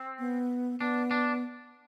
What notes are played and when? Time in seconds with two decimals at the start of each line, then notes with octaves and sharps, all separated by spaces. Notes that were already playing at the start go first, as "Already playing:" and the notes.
Already playing: C4
0.19 B3
0.80 B3 D4
1.11 D4